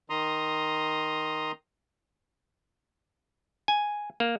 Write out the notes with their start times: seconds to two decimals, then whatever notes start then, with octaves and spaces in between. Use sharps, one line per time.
0.10 D#3 A#5 C6 D#6
3.68 G#5
4.20 A#3